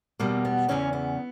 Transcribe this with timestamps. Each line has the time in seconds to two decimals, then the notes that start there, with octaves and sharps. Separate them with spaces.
0.20 E2 B2 G3 A#3
0.45 B3
0.68 E2 C#3 E3 C#4
0.93 B3